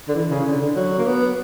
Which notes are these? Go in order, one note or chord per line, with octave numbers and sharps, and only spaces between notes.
D3
E3
C#3
D3
D3
F#3
A#3
B3